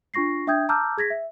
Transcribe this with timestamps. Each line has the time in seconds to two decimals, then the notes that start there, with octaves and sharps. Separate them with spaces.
0.14 D4 F4 C#6 A#6 C7
0.47 D4 E5 G5 D#6 G6 G#6
0.69 A5 A#5 D6 E6 F6 G6
0.98 G#4 G#6 A#6 B6
1.10 E5